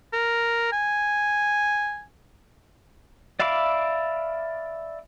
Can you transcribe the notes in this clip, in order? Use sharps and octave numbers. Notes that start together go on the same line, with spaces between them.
A#4
G#5
D5 E5 F5 B5 D6